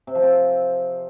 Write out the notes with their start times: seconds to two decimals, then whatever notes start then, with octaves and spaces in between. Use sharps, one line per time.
0.07 C3
0.15 F3
0.23 C4